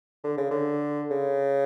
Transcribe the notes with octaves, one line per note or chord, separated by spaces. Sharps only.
D3
C#3
D3
C#3